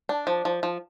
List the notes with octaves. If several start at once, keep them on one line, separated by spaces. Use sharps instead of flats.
D4
F3
F3
F3